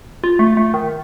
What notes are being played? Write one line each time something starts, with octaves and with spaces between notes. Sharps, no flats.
F4
A3
A3
D#3